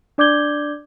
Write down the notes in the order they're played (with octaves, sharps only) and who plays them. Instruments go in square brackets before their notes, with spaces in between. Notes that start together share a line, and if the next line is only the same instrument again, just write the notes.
[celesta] D4 D5 D6 G6 G#6 G7